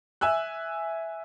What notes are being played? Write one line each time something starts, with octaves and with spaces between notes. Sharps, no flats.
E5 G#5 E6 F#6